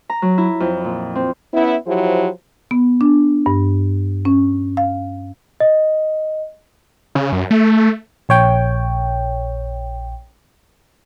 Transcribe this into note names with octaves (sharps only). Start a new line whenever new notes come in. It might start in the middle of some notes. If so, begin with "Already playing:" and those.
A#5
F#3
E4
F2
A#2
C4
B3 C#4 E4
F3 F#3 E4 G4 C5
B3
D4
G2
C#4
F5
D#5
C#3
F#2
A3
A#1 C#5 G5